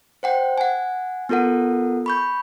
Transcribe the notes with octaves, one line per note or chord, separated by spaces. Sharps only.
C5 F#5 G5
F#5 G#5
B3 F4 A4 A#4 F#5
B5 C#6 G6